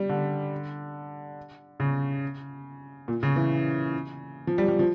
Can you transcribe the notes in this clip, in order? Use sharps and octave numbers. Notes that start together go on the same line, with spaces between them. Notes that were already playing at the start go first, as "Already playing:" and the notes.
Already playing: G3
D3
C#3
A#2
C#3
E3
F3
G3
G3
F3